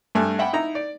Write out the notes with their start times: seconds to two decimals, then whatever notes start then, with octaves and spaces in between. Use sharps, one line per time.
0.15 G2 A3 G#5
0.39 E5 F#5 G5 B5
0.53 D#4 E4 A#5
0.75 D5